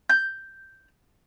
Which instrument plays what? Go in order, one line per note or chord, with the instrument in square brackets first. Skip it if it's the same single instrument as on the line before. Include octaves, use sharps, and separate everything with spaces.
[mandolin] G6